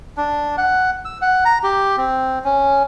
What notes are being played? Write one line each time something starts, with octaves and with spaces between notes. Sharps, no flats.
D4
F#5
E6
F#5
A#5
G4
C4
C#4